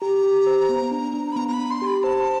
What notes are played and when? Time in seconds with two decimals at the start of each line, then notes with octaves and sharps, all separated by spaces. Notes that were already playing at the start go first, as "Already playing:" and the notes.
0.01 G4 A#5
0.24 G4
0.47 C5
0.69 B3
0.91 D4
1.14 D4
1.32 B5
1.36 B3 A#5
1.48 A#5
1.53 B5
1.59 D4
1.71 C6
1.82 G4
1.87 B5
2.03 C5 A5